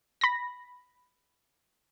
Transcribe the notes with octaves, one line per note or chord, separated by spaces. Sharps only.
B5 A#6